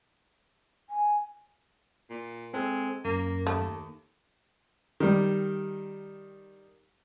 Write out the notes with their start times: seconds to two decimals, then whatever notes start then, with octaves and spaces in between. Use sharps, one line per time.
0.90 G#5
2.10 A#2
2.54 G#3 C4 A4
3.05 F#2 A#3
3.47 D#2 A3
5.00 D#3 G3